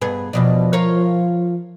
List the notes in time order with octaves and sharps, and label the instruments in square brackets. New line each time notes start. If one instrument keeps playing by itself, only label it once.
[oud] G2 B3 G#4
[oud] E2 B2 D4 [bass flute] F3
[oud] F4 A#4 C#5